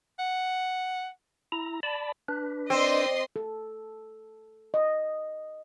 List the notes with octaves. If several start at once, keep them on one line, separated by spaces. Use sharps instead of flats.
F#5
E4 A#5
D5 A5 B5
D4 B4
C4 D5 D#5 C6
A4
D#5